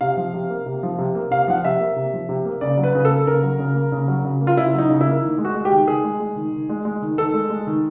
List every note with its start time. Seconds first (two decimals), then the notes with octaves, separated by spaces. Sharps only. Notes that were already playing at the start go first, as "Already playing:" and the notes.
0.01 C3 F5
0.17 F3
0.34 C3
0.50 A#3
0.66 C3
0.83 F3
0.98 C3
1.15 A#3
1.31 C3 F5
1.47 F3 F#5
1.57 F5
1.65 C3 E5
1.80 A#3
1.96 C3
2.13 F3
2.29 C3
2.45 A#3
2.61 C#3 D5
2.77 F#3
2.83 B4
2.95 C#3
3.05 A4
3.10 A#3
3.27 C#3 A#4
3.43 F#3
3.59 C#3
3.75 A#3
3.92 C#3
4.08 F#3
4.25 C#3
4.41 A#3
4.47 F4
4.57 C#3 E4
4.74 F#3 D#4
4.90 C#3
5.01 E4
5.07 A#3
5.23 D#3
5.38 G#3
5.45 F#4
5.55 G#3
5.65 G4
5.71 D#3
5.87 D#3 G#4
6.04 G#3
6.20 G#3
6.36 D#3
6.52 D#3
6.69 G#3
6.85 G#3
7.02 D#3
7.17 D#3 A4
7.34 G#3
7.50 G#3
7.67 D#3